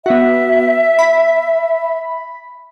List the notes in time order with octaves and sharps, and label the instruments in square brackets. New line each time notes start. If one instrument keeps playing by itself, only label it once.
[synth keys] B3 F#4 [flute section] E5
[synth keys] B5